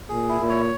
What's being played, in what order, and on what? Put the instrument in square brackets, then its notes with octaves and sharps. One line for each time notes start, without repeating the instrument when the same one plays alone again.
[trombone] A#2 [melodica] G#4
[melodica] E4
[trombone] A#2
[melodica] C#5